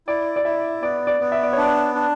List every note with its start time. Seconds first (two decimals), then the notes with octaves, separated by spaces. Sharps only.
0.07 E4 D5
0.36 D5
0.45 E4 E5
0.82 B3 D5
1.07 D5
1.20 B3
1.32 E5
1.43 D5
1.53 D4 C#5
1.63 D5
1.95 D4